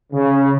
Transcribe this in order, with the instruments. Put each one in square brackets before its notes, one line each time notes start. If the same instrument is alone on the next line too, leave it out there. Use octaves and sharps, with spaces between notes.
[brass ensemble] C#3